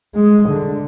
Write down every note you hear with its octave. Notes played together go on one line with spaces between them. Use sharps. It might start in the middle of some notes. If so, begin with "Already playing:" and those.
G#3
D3